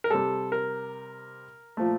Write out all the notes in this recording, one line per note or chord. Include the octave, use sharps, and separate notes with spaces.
A#4
C3 G3 A4
A#4
A#2 F3 A3